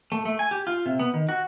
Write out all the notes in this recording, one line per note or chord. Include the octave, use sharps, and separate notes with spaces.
A3
A3
G#5
G4
F4
C3
B3
D#3
F#4